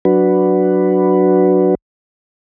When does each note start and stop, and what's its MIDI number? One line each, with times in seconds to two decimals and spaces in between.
0.05 1.75 54
0.05 1.75 62
0.05 1.75 66
0.05 1.75 71